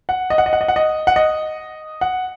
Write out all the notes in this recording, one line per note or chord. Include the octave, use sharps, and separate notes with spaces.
F#5
D#5
F#5
D#5
F#5
D#5
F#5
D#5
F#5
D#5
F#5